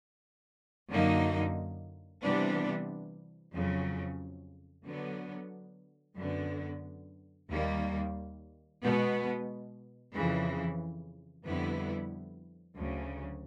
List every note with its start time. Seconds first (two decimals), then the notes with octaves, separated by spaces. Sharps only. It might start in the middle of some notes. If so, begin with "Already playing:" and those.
0.90 F#2 D3 F#3 A#3 D#4
2.22 C3 E3 G3 B3 D4
3.53 F2 C#3 F#3
4.85 D3 F#3 B3
6.17 F#2 D3 F#3 B3
7.49 D#2 D#3 G3 A#3
8.81 B2 G#3 B3
10.12 F2 C#3 E3
11.45 F2 D3 G3 B3 E4
12.76 D2 C#3 F#3